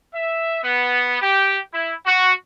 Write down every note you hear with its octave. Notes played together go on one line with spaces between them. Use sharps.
E5
B3
G4
E4
F#4